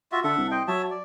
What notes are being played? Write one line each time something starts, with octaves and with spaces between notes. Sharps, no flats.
F4 F#4 E5
D3 A4 E5 F#5
C2
C5 D#5 G5
F#3 C#5 E5 A5
D5